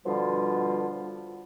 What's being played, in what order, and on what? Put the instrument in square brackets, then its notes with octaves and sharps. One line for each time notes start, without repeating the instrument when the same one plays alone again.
[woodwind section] B2 D3 F3 G3 F4